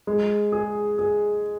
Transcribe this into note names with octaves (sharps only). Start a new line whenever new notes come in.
G#3
G#4
G#4